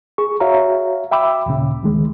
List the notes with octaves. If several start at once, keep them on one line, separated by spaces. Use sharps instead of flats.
G#4 C#6
F#4 C#5 E5 F5 A#5
E5 G5 B5 D6 E6
D#2 A#2 C#3
D2 D#3 G#3